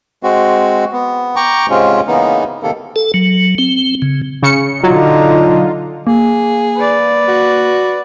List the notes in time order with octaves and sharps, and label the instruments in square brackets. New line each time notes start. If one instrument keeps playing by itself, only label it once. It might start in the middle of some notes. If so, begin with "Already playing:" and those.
[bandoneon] G#3 C4 F#4
B3
G5 A#5 C#6 D6
G#2 C3 G#3 C4 C#4 F4
C#3 E3 A#3 B3 D#4
C3 D#3 A#3 A4
[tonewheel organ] A4
F#3
C4
C#3
[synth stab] C#3 C#7
[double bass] D3 D#4 [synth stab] F#3 [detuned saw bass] F4
[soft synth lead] A#3 [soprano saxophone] G#4
[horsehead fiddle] B4 D5
[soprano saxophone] F#4